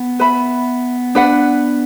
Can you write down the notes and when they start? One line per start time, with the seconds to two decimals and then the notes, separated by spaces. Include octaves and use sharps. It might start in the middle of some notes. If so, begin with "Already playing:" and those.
Already playing: B3
0.20 B4 E5 B5
1.15 D4 B4 F#5